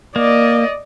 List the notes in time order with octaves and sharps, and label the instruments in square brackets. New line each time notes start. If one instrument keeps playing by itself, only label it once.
[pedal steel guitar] A#3 [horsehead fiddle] D5 D#5